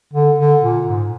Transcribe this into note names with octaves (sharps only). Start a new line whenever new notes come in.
D3
D3
A#2
G#2